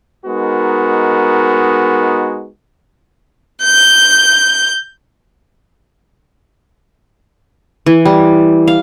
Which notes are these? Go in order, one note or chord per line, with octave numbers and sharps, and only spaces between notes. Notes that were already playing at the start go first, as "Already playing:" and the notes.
G#3 B3 D#4 F#4 A#4
G6
E3
G3
F5